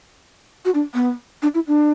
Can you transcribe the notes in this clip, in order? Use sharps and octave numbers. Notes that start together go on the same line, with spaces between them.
F#4
D4
B3
D4
E4
D4